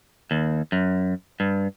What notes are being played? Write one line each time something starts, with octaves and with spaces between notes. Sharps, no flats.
D#2
F#2
G2